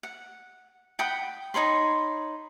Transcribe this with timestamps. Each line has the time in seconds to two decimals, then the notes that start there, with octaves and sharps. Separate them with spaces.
0.03 F#5
0.99 F#5 G5 B5 D#6
1.54 D#4 C#5 B5 C6